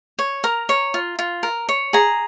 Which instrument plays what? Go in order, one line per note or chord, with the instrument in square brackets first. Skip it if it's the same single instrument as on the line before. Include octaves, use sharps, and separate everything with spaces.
[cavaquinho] C#5
A#4 A#5
C#5
F4
F4
A#4
C#5
G#4 A#5